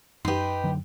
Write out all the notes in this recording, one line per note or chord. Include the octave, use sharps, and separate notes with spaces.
F#2 D#4 G4 B4 C6
D3 F#3